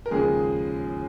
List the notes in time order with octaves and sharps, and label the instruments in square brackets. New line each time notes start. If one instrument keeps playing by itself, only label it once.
[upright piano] A#4
D#2 C#3 F3 G#3 G#4